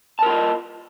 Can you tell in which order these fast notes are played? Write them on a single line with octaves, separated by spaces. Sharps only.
A5 A#4 F4 D#5